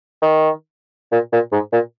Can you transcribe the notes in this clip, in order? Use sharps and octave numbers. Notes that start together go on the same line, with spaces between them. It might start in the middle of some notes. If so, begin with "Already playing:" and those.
D#3
A#2
A#2
G#2
A#2